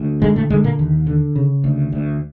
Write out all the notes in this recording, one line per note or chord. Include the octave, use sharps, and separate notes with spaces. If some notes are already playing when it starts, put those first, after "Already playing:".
Already playing: D2
G#2 D3 G#3
A2 A3
G#2 D3 G#3
A#2 A#3
D#2
D3
C#3
D2
D2